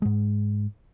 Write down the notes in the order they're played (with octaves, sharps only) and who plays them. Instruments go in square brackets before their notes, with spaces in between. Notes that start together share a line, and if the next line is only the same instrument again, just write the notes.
[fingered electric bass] G#2 G#3